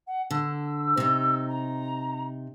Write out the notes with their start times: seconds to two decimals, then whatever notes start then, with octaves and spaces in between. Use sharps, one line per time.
0.07 F#5
0.31 D3 E6
0.97 C3 D#4
1.48 A#5